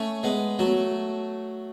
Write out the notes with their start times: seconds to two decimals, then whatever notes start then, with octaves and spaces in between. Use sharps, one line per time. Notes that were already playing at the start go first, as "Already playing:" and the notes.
Already playing: A3 C#4
0.23 G#3 B3
0.59 F#3 A3